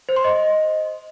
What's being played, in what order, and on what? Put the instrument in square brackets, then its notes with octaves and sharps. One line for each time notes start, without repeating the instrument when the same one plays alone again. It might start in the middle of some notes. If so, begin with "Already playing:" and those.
[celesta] C5
C6
D#5